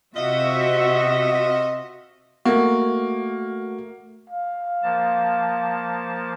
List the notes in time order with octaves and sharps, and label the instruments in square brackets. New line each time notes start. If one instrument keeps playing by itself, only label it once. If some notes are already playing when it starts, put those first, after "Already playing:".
[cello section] C3 F#4 E5 [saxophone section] F4 D#5
[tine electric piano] A3 F#4 [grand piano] A#3
[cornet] F5
[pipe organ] F3 A#3 A5